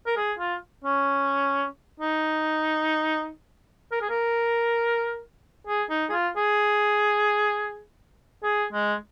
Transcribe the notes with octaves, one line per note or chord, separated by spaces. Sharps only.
A#4
G#4
F4
C#4
D#4
A#4
G#4
A#4
G#4
D#4
G#4
F4
G#4
G#4
G#3